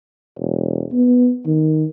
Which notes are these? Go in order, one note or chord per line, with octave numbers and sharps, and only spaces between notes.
E1
B3
D#3